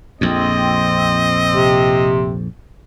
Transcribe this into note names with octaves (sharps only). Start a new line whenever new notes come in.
A#1 F2 C4 D#5
C3